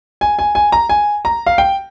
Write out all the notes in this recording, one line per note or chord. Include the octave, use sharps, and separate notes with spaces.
G#5
G#5
G#5
A#5
G#5
A#5
F5
G5